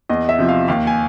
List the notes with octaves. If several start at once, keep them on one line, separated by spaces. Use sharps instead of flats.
E2 D#5
E5
C3 F3
F5
D#2 F5
G#5